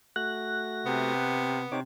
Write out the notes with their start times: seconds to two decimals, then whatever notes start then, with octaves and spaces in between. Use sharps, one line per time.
0.16 A3 F#4 F#6 A#6
0.86 C3 B3
1.72 C3 D#4 C#5 D6